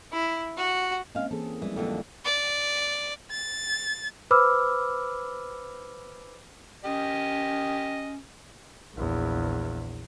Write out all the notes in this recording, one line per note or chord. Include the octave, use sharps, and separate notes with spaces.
E4
F#4
G#3 A#3 C4 C#4 F5
E3 A#3 G#4 A4
E3 F3 G3 G#3
F2 D3 E3 A#3 A4
D5
A6
B4 C5 B5 D6 E6 F6
C#4 G4 D#5
A#1 E2